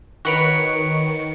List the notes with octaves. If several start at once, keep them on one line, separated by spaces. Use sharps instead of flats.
D#3 F#4 B4 C#5 C#6 C#7 D7